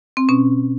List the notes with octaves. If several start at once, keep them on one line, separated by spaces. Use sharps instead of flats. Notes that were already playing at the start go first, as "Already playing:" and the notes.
C4
B2 C#4